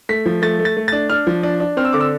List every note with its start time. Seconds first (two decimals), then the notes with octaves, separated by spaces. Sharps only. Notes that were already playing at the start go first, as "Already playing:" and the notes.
0.09 A3 B6
0.26 F3
0.42 A3 A6
0.59 A3
0.65 A6
0.77 A3
0.88 A6
0.92 D4
1.10 D4 F6
1.27 F3
1.43 D4
1.60 D4
1.77 C4 F6
1.85 E6
1.93 D3 D6
2.01 E6